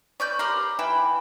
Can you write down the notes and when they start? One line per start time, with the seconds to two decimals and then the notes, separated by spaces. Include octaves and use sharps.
0.20 C#4 B4 D5 G6
0.39 G4 A#4 B5 C6
0.79 E3 G5